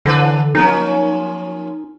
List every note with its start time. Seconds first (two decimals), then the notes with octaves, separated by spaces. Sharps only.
0.06 D3 D#3 D4 B4
0.55 F3 A#3 C#4 D#4